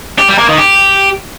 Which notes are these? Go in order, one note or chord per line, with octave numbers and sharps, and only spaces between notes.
G4
G3
A#3
D#3
G4